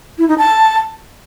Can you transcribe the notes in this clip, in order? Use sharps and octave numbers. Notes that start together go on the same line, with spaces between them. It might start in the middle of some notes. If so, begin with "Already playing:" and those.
E4
D#4
A5